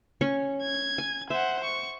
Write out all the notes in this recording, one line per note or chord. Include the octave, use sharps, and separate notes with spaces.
C#4 C#5 C#6
G#6
G#5
C5 E5 F#5
C#6